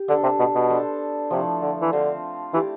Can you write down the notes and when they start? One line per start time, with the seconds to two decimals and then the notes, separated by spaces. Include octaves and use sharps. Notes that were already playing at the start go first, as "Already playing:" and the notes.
Already playing: G4
0.08 D3 B3 D4 A4
0.23 C3
0.39 B2
0.55 B2
0.69 B3 D4 A4 C5
1.30 C3 F3 A3 E4 A4
1.61 D3
1.82 E3
1.92 D3 C4 F4 C5 F5
2.53 E3 A3 E4 G4 D5